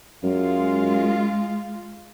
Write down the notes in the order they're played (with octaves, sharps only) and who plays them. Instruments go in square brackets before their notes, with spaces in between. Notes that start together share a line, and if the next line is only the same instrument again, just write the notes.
[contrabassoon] F#2 [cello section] G#3 F4